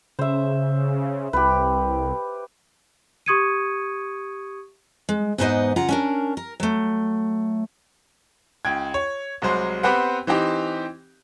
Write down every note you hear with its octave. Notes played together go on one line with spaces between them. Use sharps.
C#3 C5 E5
C2 G4 B4
G4 C#6 D#6 G#6 C#7 D#7
G#3
E2 G#2 B3 D#4 C5 D#5
C#3 F4 F#5 A#5
C#4 D4 A#4
A#4
F#3 A3
C#2 G5 G#6
C#5
C2 F#3 G#3 C5
B3 C4 G4 B4 F#5
E3 C4 D#4 G4